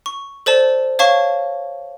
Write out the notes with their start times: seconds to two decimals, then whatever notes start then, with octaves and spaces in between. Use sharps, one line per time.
0.06 C#6
0.46 A4 C5 D5 A5
0.99 C#5 F5 A5 C#6